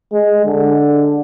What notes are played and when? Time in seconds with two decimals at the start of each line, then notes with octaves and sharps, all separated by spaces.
0.12 G#3
0.46 D3